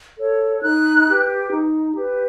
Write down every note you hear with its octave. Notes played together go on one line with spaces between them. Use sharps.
A4 C#5
D#4 F#6
G4 B4
D#4
G4 B4